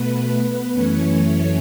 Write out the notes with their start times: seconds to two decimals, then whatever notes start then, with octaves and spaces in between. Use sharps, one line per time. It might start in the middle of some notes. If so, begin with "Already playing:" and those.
Already playing: B2 A3 B3 B4
0.72 F#2 E3 A3 C#4 C#5
1.20 C#4 C#5